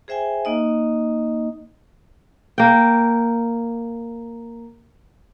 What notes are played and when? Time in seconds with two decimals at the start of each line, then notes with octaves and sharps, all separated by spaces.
0.08 G#4 C5 E5 G5 G#5
0.45 A#3 D#4 D#5
2.58 A#3 G5